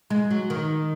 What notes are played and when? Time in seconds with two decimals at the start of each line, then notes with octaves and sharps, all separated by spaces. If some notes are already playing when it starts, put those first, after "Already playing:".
0.10 G#3
0.31 F#3
0.50 D#3